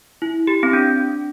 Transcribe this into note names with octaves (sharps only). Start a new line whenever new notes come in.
E4
G4
C4
D4